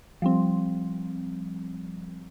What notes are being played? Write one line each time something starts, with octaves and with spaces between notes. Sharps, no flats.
F3 G3 C4